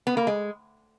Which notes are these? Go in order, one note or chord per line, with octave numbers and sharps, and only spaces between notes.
B3
A#3
G#3